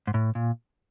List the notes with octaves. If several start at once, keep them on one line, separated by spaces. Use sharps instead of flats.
G#2
A2
A#2